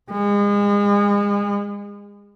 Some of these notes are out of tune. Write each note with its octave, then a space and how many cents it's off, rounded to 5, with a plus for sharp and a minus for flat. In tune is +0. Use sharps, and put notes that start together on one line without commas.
G#3 -35